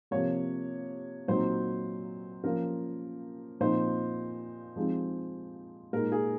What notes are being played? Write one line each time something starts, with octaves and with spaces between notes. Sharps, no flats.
C3 F3 A#3 C#5
A#2 F#3 C4 D#4 C5
F3 A#3 C#4 A#4
A#2 F3 C4 D#4 C5
F3 G#3 C4 D#4
A#2 G#3 D#4 A#4
G#4